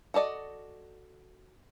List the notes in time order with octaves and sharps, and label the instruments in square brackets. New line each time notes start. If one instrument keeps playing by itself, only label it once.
[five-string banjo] F#4 A4 D5 D#5